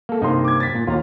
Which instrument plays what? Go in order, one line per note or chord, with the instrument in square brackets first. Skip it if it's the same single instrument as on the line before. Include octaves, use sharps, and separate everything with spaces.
[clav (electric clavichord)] A#3 A4
[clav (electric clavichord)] G2 C3 A#3 [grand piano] D#4 C6
[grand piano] D6 G#6
A6 B6
[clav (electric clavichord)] A#2
[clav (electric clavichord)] D#2 A#5 [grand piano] F4